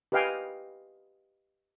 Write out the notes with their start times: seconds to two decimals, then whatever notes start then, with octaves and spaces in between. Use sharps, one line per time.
0.12 G4 B4 D#5 F5 G5 G#5